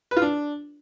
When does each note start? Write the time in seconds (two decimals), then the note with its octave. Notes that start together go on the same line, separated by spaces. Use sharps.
0.11 B4
0.17 F4
0.22 D4